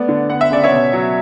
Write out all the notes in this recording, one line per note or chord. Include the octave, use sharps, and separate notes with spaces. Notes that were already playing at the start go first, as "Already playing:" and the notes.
Already playing: A3 B3 D5
D3
B3 F#5
E5
C#3 D5
C#5 E5
B2
F#3